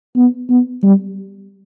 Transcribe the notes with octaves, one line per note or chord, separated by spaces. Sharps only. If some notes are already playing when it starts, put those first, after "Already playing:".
B3
B3
G3